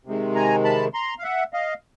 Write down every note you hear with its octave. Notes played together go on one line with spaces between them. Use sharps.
C3 D#3 G#3
G#5 A#5
A5 B5
A#5 C6
F5
E5 F#5
D#5 F5